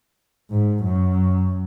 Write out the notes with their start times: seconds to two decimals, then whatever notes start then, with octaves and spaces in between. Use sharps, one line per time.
0.50 G#2
0.83 F#2